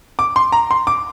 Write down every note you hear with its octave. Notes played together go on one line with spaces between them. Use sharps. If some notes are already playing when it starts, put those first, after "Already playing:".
D6
C6
A#5
C6
D6